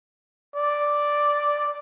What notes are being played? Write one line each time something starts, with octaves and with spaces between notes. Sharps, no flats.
D5